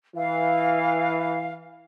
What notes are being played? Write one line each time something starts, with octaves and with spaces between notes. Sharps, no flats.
E3 F5